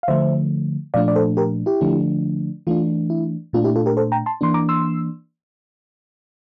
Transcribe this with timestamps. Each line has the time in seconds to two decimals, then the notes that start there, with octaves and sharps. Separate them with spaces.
0.03 F5
0.08 D3 F3 A3 C5 E5
0.94 A#2 F3 A3 D4 D5 F5
1.08 D5
1.16 A4 C5
1.37 G4 A#4
1.66 E4 G4
1.81 D3 F3 A3 D4
2.67 E3 A3 D4 F4
3.10 E4
3.53 A#2 A3 D4 F4
3.64 E4 G4
3.76 F4 A4
3.86 G4 A#4
3.97 A4 C5
4.12 G5 A#5
4.26 A5 C6
4.41 E3 A#3 D4 C6
4.54 A#5 D6
4.69 C6 E6